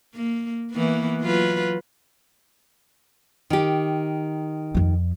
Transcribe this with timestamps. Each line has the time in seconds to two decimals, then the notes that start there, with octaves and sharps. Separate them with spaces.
0.15 A#3
0.72 E3 A#3 B3
1.21 F#3 F4 B4
3.50 D#3 G4
4.74 F2 F3